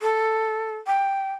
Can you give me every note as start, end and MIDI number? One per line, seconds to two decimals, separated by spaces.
0.02 0.76 69
0.87 1.34 79